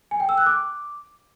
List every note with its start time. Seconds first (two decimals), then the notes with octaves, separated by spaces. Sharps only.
0.11 G#5
0.20 G5
0.29 E6
0.38 F#6
0.46 D6